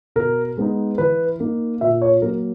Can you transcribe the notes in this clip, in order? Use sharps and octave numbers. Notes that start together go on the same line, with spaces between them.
B2 A#4
G#3 B3 D#4
E3 B4
A#3 D#4
A#2 E5
C#5
F#3 A#3 A#4